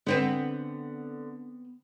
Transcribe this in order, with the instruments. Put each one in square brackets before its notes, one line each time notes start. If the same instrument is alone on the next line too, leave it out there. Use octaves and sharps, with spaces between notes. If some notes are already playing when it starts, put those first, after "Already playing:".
[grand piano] D3 [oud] B3 C4 B4